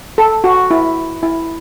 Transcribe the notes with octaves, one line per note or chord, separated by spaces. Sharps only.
A4
F#4
E4
E4